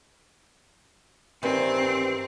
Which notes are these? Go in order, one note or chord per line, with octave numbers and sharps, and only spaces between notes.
G2 D#3 E3 C4